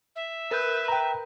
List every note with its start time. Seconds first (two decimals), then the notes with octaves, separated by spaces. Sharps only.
0.16 E5
0.51 A#4 B4 G6
0.88 G5 A#5